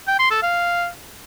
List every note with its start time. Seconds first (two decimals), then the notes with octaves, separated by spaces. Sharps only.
0.08 G5
0.19 C6
0.31 A4
0.43 F5